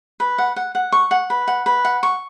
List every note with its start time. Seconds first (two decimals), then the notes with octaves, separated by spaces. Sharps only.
0.20 B4
0.38 F#5
0.56 F#5
0.75 F#5
0.92 C#6
1.11 F#5
1.30 B4
1.48 F#5
1.66 B4
1.85 F#5
2.03 C#6